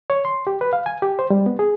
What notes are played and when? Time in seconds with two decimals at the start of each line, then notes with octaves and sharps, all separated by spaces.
0.10 C#5
0.25 C6
0.47 G4
0.61 B4
0.73 F5
0.86 G#5
1.02 G4
1.19 C5
1.30 G3
1.46 B3
1.59 G#4